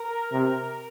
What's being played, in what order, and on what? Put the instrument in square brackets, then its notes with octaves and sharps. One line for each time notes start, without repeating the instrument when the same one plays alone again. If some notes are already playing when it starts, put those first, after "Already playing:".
Already playing: [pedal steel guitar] A#4
[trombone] C3